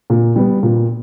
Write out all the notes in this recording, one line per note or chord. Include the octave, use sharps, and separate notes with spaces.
A#2
G3 B3
A#2